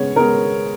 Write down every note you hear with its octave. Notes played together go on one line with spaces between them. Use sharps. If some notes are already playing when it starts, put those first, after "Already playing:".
Already playing: C#3 G#3 B3 C#5
C#3 G#3 B3 A#4